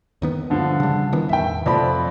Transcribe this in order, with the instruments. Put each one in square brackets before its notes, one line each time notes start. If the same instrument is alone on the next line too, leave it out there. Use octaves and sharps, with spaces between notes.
[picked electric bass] D#2 D#3 B3
[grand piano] G2 D3 F3
[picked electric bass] C#3 G3
D#3 E3 B3
[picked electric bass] A1 E2 D#3 [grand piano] E5 G5
[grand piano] F2 D5 B5 [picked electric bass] C3 F3 A3